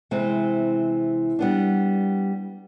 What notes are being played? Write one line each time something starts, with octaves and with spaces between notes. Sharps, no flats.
C3 E3 G#3 C4
G3 B3 D4